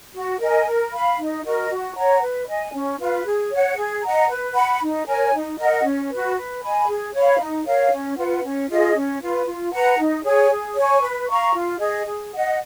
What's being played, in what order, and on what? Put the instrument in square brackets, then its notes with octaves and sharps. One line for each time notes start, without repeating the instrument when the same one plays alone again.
[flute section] F#4
A#4 D#5 G#5
A#4
F5 B5
D#4
F#4 A#4 D#5
F#4
C#5 F#5 A#5
B4
D#5 G#5
C#4
F4 B4
G#4
C#5 F#5
G#4
D#5 F#5 A#5
B4
F#5 B5
D#4
A#4 C#5 G#5
D#4
A#4 D#5 F#5
C#4
F#4 B4
B4
D#5 G#5 B5
G#4
C#5 F5 B5
D#4
A#4 C#5 F5
C#4
F4 B4 F#5
C#4
F4 G#4 D#5
C#4
F4 B4
F4
B4 F#5 A#5
D#4
G#4 C#5 G#5
G#4
C#5 G#5 C#6
B4
F5 A#5 C#6
F4
G#4 D#5
G#4
D#5 F#5